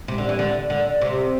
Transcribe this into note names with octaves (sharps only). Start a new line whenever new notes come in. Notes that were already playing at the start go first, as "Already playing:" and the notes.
C3
D3
E3
D3
D3
C3